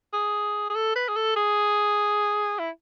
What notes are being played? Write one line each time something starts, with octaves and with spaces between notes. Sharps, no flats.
G#4
G#4
A4
B4
G#4
A4
G#4
E4